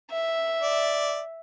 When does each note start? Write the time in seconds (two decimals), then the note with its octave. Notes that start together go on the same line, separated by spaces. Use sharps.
0.11 E5
0.62 D5